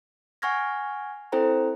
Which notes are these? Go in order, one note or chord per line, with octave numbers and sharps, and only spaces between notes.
F#5 G#5 C#6 F6 G#6 A#6
C4 E4 A4 C5 G5 A#5